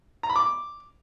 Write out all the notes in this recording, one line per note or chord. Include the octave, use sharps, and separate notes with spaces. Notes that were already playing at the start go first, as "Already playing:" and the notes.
A#5
B5
D6